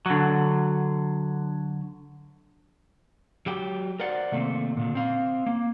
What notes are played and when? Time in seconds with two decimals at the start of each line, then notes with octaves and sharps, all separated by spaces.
0.06 D3 F#3
3.46 F#3 G4 G5
4.00 A#4 C5 D5 F#5
4.32 C3 D#3 A3 A#3 C4
4.77 A#2 D3
4.95 C4 F5
5.47 A#3